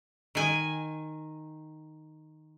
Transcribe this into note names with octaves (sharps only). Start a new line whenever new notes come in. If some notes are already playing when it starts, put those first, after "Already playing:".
D#3 G#5